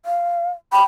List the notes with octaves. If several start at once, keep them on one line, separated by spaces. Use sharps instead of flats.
F5
G5 B5